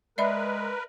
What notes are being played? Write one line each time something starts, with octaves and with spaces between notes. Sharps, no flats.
G#3 A#4 B4 D5 E5 B5